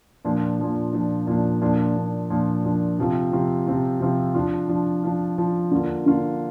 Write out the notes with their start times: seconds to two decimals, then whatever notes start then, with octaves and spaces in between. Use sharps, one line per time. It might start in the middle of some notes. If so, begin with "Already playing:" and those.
0.25 A#2 F3 D4
0.59 A#2 F3 D4
0.93 A#2 F3 D4
1.27 A#2 F3 D4
1.61 A#2 F3 D4
1.96 A#2 F3 D4
2.30 A#2 F3 D4
2.64 A#2 F3 D4
2.99 C3 F3 C4 F4
3.32 C3 F3 C4 F4
3.67 C3 F3 C4 F4
4.01 C3 F3 C4 F4
4.35 F3 D4 F4
4.69 F3 D4 F4
5.03 F3 D4 F4
5.38 F3 D4 F4
5.72 D3 A#3 D4 F4
6.06 D3 A#3 D4 F4